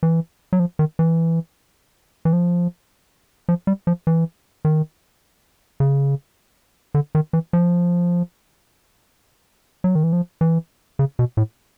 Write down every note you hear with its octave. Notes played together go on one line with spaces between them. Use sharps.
E3
F#3
F3
D#3
E3
E3
F3
F3
G3
F3
E3
D#3
C#3
D3
D#3
E3
F3
F#3
D#3
E3
F3
E3
C#3
B2
A2